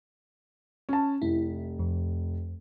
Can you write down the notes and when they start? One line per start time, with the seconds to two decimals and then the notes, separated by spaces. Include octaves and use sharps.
0.89 C#4 A5
1.22 F1 E4
1.79 F2